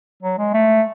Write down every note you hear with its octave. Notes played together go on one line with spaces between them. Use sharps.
F#3
G#3
A3